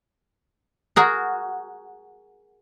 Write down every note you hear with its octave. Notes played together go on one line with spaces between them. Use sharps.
F#4 G#4 A#4